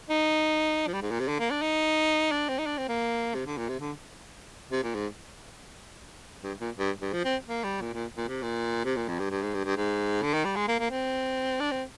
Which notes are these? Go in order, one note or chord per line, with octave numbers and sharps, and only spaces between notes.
D#4
F3
G3
G#2
A#2
C3
D3
A#3
D4
D#4
D4
C4
D#4
D4
C4
A#3
C3
D3
A#2
C3
D3
C3
A#2
G#2
G2
A#2
G2
G2
F3
C4
A#3
G3
A#2
A#2
A#2
C3
A#2
C3
A#2
F2
G2
G2
G#2
G2
G2
G#2
D3
D#3
G3
G#3
A#3
A#3
C4
D4
C4